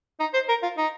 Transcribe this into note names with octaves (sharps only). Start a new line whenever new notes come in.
D#4
C5
A#4
F4
D#4